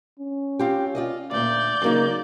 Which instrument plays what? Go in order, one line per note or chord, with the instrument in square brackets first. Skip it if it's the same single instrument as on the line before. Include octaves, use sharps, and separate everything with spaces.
[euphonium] C#4
[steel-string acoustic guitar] C4 F4 G4
F4 D5 D#5
[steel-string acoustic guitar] D2 A#2 [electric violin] D5 G6
[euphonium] C#3 [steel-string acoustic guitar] F#3 A#3 D#4